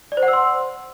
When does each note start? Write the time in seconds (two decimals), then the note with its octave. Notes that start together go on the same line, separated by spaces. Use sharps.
0.12 D5
0.17 C5
0.23 F#5
0.28 E6
0.33 C6